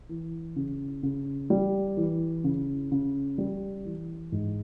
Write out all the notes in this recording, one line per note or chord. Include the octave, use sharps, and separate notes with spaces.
E3
C#3
C#3
G3
E3
C#3
C#3
G3
E3
G#2